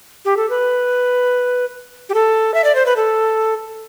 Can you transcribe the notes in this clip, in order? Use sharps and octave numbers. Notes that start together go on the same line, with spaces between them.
G4
A4
B4
G4
A4
E5
D5
C5
B4
A4